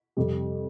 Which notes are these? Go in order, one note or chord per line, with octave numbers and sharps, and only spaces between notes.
F2 C3 G3